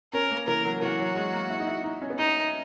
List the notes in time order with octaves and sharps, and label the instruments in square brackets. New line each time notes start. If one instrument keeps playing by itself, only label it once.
[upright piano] C#4 [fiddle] A#4
[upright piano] A#3
[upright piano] E3 [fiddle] A#4
[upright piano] F#3
[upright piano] E3 [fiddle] F#4
[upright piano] F#3
G#3
A#3
E4
D#4
E4
D#4
C#4
B3
[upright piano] C#4 [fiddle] D#4